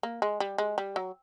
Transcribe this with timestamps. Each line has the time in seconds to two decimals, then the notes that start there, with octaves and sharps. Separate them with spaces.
0.03 A#3
0.22 G#3
0.40 G3
0.58 G#3
0.78 G3
0.96 F#3